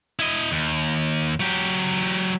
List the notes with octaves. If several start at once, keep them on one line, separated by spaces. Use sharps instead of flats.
E4 D#5
D#2
F#3 G4